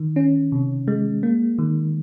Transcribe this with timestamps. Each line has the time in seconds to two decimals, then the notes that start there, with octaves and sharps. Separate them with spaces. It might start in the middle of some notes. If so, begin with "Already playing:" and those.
Already playing: D#3
0.16 C#4
0.52 C3
0.88 G#3
1.23 A#3
1.59 D#3